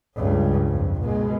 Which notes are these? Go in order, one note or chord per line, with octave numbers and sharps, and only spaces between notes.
C#2 G2
F2
B2 G#3